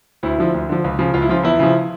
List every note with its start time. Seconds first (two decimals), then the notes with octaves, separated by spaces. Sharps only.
0.23 D2 E4
0.38 D3 F3
0.54 D2
0.69 D3 F3
0.84 C#2
0.99 C#3 F3
1.14 C#2 F4
1.22 E4
1.29 C#3 F3 F4
1.44 E2 E4
1.59 C#3 F3